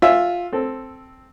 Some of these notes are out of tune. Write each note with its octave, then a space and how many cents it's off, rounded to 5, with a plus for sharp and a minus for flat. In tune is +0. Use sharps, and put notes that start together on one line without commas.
F4 +10 E5 +0 G#5 +0
C4 +0 A4 +0